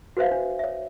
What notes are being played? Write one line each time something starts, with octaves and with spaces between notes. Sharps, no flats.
F#4 B4 C5 E5 F5
D4
C#5 E5